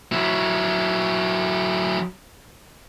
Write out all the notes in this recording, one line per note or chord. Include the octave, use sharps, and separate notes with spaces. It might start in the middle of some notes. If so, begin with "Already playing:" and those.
F#3 E4